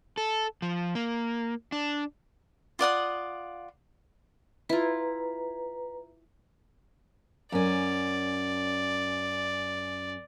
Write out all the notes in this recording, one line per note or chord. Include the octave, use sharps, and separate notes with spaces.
A4
F3
A#3
D4
F4 D5 F#5 D#6
E4 F4 B4 A#5
F#2 C#4 D5